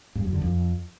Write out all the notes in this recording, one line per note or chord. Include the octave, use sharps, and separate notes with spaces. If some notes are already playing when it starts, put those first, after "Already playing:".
G2
F#2
D3
F2